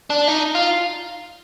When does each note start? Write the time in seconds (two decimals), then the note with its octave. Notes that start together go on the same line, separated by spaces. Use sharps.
0.10 D4
0.28 D#4
0.55 F4